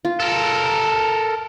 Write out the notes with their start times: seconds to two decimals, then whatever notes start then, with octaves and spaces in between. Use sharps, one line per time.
0.05 F4
0.20 A4 A#4